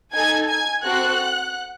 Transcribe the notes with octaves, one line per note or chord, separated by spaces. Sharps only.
D#4 A4 G#5 G#6
G#5 G#6
C4 F#4 A4 F#5 F#6